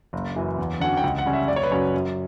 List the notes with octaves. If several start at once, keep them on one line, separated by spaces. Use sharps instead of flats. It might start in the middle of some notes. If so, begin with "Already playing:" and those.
F#1
F#2 E3
E2
D3 F#3 C#4 F#5
G5
C#2 F#5
F#5
C#3 G3 C#4
E5
F#1 D5
C#5
B4
F#2 C#3 F#3 C#4 C#5
F#2